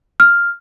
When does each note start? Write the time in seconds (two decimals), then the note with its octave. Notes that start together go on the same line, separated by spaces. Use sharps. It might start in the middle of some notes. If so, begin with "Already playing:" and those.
0.20 F6